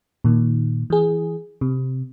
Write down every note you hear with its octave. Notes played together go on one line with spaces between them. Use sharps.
A#2 D#3
E3 G#4
C3